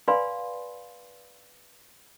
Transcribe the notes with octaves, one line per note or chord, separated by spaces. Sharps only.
B4 D5 F5 G#5 B5 C6